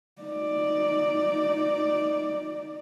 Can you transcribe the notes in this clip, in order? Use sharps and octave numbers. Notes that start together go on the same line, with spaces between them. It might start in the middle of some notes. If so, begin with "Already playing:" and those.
D#4 D5